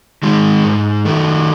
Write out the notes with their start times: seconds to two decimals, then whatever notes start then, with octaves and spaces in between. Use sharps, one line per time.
0.23 D#3 G#3
0.64 G#2
1.05 D#3 A3